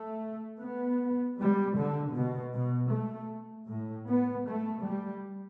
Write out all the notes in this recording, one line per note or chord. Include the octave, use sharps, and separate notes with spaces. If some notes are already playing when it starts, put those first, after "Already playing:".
Already playing: A3
B3
G3
D3
B2
B2
A3
A2
B3
A3
G3